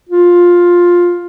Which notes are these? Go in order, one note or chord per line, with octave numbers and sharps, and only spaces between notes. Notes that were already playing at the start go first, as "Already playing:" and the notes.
F4